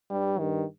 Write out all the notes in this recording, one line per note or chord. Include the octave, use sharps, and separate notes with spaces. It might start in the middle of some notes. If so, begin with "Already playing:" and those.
G2 G3
G2 D#3